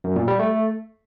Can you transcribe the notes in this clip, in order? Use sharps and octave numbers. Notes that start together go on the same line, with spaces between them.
F#2
A#2
G3
A3